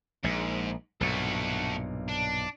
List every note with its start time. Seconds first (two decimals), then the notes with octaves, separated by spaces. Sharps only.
0.24 A#1 G#2
1.01 B1 G2 A#2 A3 F#4
2.08 D4